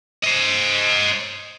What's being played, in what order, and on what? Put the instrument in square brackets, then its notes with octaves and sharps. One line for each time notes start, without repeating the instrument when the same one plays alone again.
[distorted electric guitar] C5 D#5